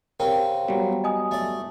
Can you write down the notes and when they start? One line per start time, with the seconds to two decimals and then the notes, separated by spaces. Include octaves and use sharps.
0.20 C#3 C4 G4 A#4 G5
0.68 F#3 G3 B3
1.04 D#5 G#5 D#6
1.31 A3 D5